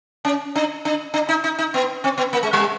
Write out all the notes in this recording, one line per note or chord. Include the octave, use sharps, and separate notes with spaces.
C#4
D4
D4
D4
D#4
D#4
D#4
B3
C4
B3
A#3
G#3
G3